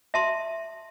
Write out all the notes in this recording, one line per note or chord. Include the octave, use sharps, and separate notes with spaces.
E5 A5 C6